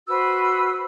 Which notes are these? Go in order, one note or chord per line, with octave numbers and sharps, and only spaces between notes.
F#4 B4 C5 E6